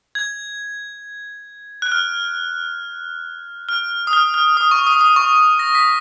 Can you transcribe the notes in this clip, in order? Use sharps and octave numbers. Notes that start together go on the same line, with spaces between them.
G#6
F#6
F6
F6
D#6
F6
F6
D#6
C#6
D#6
D#6
C#6
A#6
B6